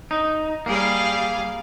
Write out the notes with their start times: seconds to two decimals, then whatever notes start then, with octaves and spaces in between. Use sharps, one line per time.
0.11 D#4
0.66 G3 A#3 G#4 F5